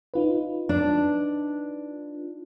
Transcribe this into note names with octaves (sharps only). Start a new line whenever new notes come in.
D#4 F4 B4
D4